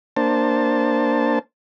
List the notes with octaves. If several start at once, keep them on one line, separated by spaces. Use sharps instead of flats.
A#3 D4 C5 A5